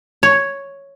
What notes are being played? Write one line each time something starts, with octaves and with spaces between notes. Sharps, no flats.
C#5